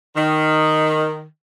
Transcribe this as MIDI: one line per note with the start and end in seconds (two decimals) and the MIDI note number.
0.16 1.24 51